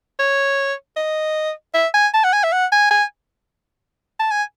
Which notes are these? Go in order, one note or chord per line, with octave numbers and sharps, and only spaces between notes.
C#5
D#5
E5
G#5
A5
F#5
G#5
E5
F#5
G#5
G#5
A5
G#5